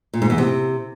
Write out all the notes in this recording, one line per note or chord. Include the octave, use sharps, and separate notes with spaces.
A#2
G#2
E2
C3